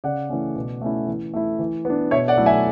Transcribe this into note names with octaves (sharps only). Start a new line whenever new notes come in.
C#3 D5 F#5
E3 A3 C#4
B2
A3 C#4 E4
E3
A3 E4
E3
B3 D4
B2 C#5 E5
D5 F#5
F#3 A3 E4
E5 G#5